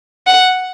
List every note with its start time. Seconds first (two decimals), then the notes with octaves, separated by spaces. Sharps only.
0.27 F#5